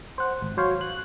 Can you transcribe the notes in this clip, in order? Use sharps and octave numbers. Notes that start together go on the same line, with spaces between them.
C5 F#5
G#1
F#3 C5 C#5 F5
F#6